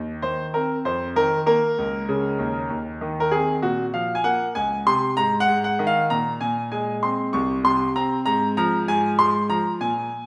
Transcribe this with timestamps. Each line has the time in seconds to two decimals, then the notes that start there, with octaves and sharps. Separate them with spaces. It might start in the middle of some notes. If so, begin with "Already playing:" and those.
Already playing: D#2
0.22 D#3 C5
0.54 C4 A#4
0.85 F2 C5
1.16 D#3 A#4
1.46 A#3 A#4
1.78 C#2
2.09 C#3
2.39 D#2
2.70 D#2
3.01 D#3
3.20 A#4
3.31 C4 G#4
3.62 A#2 F#4
3.93 F3 F5
4.15 G#5
4.24 A#3 F#5
4.55 C#2 G#5
4.86 C3 C6
5.17 G#2 A#5
5.40 F#5
5.48 G#2
5.64 F#5
5.79 D#3
5.87 F5
6.10 A#2 A#5
6.41 A#2 G#5
6.72 G#3 G#5
7.03 C4 C6
7.33 C2 C#6
7.64 C3 C6
7.96 C4 A#5
8.26 G#2 A#5
8.57 F3 A#5
8.88 G#2 G#5
9.19 G#2 C6
9.49 F3 A#5
9.80 A#2 G#5